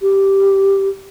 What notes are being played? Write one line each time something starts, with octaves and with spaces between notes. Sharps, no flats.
G4